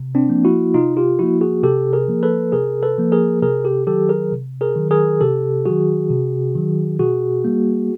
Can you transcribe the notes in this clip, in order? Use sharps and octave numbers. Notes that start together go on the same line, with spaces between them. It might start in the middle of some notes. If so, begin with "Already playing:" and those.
Already playing: C3
C4 D4
F3 A#3
E4 F#4
C3 D#4 F4
F4 G4
F3 A#3 E4 F#4
F#4 G#4
C3 G4 A4
G#4 A#4
F3 A#3
A4 B4
C3 G#4 A#4
A4 B4
F3 A#3
G#4 A#4
C3 G#4 A#4
G4 A4
D#3 F#3 G4 A4
G#4 A#4
C3
G#4 A#4
D#3 F#3
G#4 A#4
C3 G4 A4
D#3 F#3 F#4 G#4
C3
D#3 F#3
B2 F#4 G#4
G3 A#3